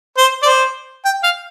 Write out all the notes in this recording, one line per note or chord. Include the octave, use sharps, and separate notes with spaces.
C5
D5
C5
G5
F5